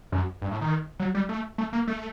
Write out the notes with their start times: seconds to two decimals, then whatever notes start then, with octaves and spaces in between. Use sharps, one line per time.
0.12 F#2
0.42 G2
0.51 A2
0.61 D#3
1.00 F#3
1.15 G3
1.29 A3
1.58 A3
1.73 A#3
1.88 A3